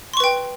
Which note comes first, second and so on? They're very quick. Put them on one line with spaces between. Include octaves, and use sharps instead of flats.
C6 C#6 B4 G5